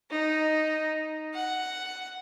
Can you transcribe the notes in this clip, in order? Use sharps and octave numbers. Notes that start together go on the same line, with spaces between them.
D#4
F#5